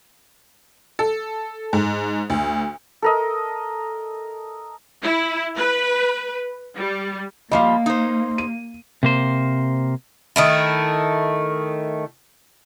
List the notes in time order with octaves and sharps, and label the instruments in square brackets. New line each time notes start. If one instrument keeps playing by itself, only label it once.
[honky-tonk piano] A4
G#2
D2
[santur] A4 A#4 D#5
[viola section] E4
B4
G3
[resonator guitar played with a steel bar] F3 G3 [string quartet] A#3 [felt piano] D#5 F5
[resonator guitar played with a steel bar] D#4 C5
[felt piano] D#7
[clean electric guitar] C3 A#3 C5
[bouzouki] D#3 A3 E4